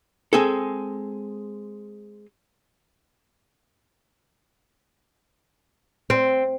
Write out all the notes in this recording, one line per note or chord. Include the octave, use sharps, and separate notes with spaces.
G#3 C4 G#4 A4
C4